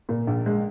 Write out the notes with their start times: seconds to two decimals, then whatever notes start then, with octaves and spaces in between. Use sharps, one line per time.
0.09 A#2
0.27 A#1
0.46 G#3